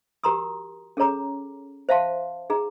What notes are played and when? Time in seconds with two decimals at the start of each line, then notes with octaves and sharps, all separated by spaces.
0.24 F#4 G4 A#4 A#5 C6 D#6
0.97 C#4 G#4 A4 C#5 A#5 D6
1.89 C5 E5 F5 A5 C6
2.50 D#4 G#4 A#5